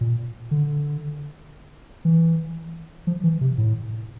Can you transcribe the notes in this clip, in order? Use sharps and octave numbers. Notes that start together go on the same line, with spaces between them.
A#2
D3
E3
F3
E3
C3
A2